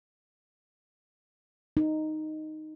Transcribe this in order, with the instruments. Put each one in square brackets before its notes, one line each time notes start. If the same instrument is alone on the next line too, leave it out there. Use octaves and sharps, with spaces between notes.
[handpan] D#4